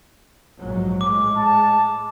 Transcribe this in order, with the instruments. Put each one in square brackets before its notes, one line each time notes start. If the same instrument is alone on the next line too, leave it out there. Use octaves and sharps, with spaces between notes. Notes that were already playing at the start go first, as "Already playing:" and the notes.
[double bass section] A#1 G#2 F#3
[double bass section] A2 G#3 [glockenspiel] D6
[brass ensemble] A5